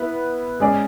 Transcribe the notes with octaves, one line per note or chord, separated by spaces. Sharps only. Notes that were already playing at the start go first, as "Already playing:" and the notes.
Already playing: B3 E4 B4
G#3 C#4 G#4 D5